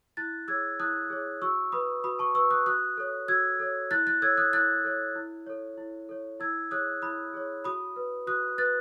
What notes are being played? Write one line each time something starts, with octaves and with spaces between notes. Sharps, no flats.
E4 F#6 A6
G#4 C#5 E6 G#6
E4 D#6 F#6
G#4 C#5
F#4 C#6 E6
B4 B5 D#6
F#4 B5 D#6
A5 C#6
B4 C#6 E6
D#6 F#6
F#4 D#6 F#6
A4 C#5
F#4 E6 G#6
A4 C#5
E4 F#6 A6
F#6 A6
A4 C#5 E6 G#6
D#6 F#6
E4 F#6 A6
A4 C#5
E4
A4 C#5
E4
A4 C#5
E4 E6 G#6
G#4 C#5 D#6 F#6
E4 B5 D#6
G#4 C#5
F#4 B5 D#6
B4
F#4 D#6 F#6
B4 F#6 A6